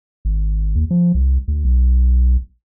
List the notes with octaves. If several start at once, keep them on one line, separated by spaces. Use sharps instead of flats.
G#1
D#2
F3
C2
D2
B1